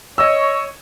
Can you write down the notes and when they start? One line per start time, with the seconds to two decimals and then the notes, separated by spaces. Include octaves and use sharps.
0.18 C#5 D#5 E6